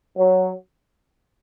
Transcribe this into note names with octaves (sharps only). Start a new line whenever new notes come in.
F#3